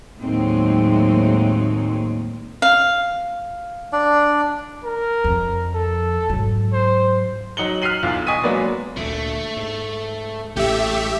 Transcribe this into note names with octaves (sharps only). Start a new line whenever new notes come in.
D#2 A2 F#3 G#3 C4 D#4
F5
D4 D5
A#4
F2
A4
G#2 F#3
C5
F#3 D#4 C#7 F#7 G7
F6 F#6 B6 C7 D#7 F#7
B1 E2 F4
D#5 G#5 C#6 D#6 B6 D#7
F#3 G#3 A#3 B3 B4 D5
D2 A#2 A3
G#2
A1 A3 G4 E5